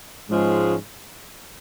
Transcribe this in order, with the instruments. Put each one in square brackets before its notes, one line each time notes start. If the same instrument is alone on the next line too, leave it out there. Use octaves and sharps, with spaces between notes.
[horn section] G#2 F3 G#3 C#4